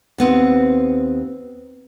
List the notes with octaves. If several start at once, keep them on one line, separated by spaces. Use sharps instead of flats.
D#2 B3 C4